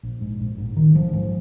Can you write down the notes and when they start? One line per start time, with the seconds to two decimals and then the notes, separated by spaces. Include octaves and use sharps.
0.03 A#1
0.21 G#2
0.40 A#1
0.58 G#2
0.77 A#1 D#3
0.94 G#2 F3
1.13 G#2 F3